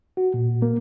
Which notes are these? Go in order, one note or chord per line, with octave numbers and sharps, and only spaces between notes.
F#4
A#2
A#3